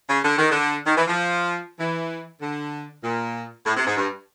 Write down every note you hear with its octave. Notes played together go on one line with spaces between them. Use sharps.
C#3
D3
D#3
D3
D#3
E3
F3
E3
D3
A#2
A2
C3
G#2
G2